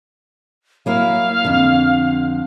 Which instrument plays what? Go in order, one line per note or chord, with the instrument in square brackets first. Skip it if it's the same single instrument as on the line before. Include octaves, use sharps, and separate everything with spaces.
[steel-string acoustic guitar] F#3 A#3 E4 [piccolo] F5
[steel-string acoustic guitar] F2 D3